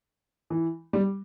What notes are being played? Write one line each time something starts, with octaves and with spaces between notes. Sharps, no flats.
E3
G3